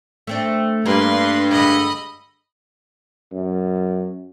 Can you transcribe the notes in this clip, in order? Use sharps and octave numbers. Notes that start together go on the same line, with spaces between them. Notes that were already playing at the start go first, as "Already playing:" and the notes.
A3 C4 D4
G2 A#3 B4 C6
D3 G#3 D#5 B5
F#2